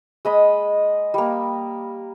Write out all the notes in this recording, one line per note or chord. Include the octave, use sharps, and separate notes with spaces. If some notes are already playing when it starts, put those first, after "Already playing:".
G#3 D#5 B5
G3 A#3